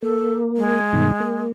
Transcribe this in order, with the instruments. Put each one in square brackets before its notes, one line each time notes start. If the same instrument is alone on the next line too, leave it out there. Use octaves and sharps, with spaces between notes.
[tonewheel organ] A#3 [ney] A4
[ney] G#3
[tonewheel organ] G2 B2 D#3
A#3